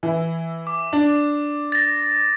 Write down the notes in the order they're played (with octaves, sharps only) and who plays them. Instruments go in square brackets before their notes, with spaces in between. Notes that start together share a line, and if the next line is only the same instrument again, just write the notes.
[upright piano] E3 E4
[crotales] D6
[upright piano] D4
[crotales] A6 A#6